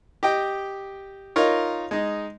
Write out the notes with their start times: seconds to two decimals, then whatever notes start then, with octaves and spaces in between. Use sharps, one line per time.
0.23 G4 D#5 G5
1.36 D#4 F4 A#4 C#5
1.91 G#3 D#4